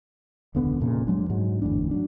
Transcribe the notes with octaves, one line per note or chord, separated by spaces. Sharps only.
E1 C#2 D3 B3
F1 A#2 C#3
F1 F#3 G#3 D4
G#2 F#3 G#3
G1 E2 A2 D4
F#3 D4